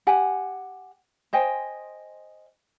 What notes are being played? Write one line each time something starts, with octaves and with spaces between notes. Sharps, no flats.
G4 F#5 G#5
C5 D#5 G5 G#5